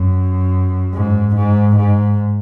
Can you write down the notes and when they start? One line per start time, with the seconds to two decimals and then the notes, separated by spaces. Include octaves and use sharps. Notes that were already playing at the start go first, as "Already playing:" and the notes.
Already playing: F#2
0.94 G#2
1.36 G#2
1.76 G#2